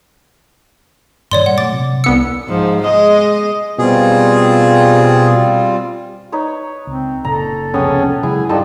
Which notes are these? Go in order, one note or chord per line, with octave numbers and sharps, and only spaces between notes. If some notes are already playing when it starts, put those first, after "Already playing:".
G2 A#2 D#3 C#5 D5 C6
G3 F#5
A#2 F#3 A3 D6 A6
C3
C2 B3 E6 C#7
G#2 F3
G#3 D#5
B2 G3 C4 F4 G#4
D#4 B4 C#5
C#2 C4
F#1 A#2 C#3 A4 A#5
C2 F2 A#2 C#3 B3 C#4 G5 D#6
C#3 F#3 G#3 E4 G#4
G2 F3 G3 D4 D#4 A4